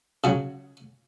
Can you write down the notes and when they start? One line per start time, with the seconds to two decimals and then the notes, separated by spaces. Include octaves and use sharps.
0.24 C#3 F#3